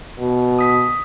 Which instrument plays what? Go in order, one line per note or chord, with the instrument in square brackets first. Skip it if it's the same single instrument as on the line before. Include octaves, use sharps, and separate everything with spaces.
[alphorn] B2
[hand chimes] D#6 B6